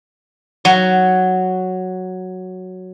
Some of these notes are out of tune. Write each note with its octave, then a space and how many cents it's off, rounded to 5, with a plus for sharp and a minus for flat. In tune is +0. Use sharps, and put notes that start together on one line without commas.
F#3 +0